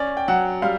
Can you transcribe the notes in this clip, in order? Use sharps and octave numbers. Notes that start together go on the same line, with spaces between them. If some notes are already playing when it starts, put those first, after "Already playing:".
Already playing: C#4 D5
G5
F#3 F#5
G3 F5